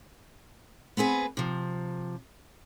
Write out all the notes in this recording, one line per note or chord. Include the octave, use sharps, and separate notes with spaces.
B3 C4 G#4 B4
C3 F3